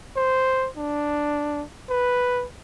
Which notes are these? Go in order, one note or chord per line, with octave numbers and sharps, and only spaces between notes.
C5
D4
B4